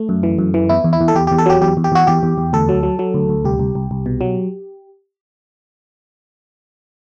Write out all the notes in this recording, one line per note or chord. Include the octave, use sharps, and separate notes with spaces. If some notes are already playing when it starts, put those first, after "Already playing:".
Already playing: A3
F#2
E3
F#2
E3
E2 E4
E2
E4
E2
A4
E2 G4
E2 G4
A4
F#3 G4
E2 G4
E2
G4
E2 F#4
E2 G4
E2
E2
D2 A4
F#3
F#3
F#3
D2
D2
C2 G4
C2
C2
C2
B2
F#3